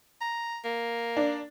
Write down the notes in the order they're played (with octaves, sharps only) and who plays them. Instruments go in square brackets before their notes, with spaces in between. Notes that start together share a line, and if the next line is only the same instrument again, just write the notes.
[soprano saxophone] A#5
A#3
[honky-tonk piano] D4